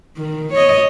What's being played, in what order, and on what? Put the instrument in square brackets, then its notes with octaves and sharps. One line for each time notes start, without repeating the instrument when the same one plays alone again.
[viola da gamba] D#3
C#5 D#5